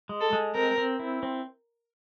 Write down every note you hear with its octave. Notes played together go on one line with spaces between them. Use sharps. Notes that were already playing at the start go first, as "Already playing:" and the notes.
G#3
A4
G#3
C4 A#4
C4
E4
C4